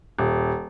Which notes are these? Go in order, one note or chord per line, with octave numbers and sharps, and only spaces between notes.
D#1